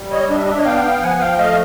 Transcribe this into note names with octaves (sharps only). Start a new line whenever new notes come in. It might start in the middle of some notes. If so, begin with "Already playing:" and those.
Already playing: G3
C#5 D#5
D4 D#5
E5
D#5
E5
C#5 D#5
B3 F5 G5
F3 F#5 G#5
F5 G5
A3 D#5 F5